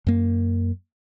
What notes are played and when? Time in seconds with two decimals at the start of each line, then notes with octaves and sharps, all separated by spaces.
0.07 F#2 A#3